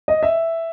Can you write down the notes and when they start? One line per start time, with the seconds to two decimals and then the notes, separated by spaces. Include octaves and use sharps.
0.08 D#5
0.23 E5